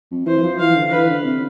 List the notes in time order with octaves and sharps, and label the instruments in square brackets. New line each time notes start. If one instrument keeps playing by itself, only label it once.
[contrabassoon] F2
[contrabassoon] E3 [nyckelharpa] C5
[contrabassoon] E3
F3
[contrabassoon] E3 [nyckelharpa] F5
[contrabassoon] D3
[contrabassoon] E3 [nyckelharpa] B4
[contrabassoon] D3
C3